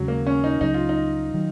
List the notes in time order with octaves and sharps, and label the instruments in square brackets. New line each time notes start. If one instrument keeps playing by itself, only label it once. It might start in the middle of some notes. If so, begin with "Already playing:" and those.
Already playing: [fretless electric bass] D#2 C#3 G#3 [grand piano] F#3
[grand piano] A#3
C#4
D#4
[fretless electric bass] C#2 C#3 F#3 [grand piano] D#4
[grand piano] F4
D#4
[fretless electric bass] D#3 F#3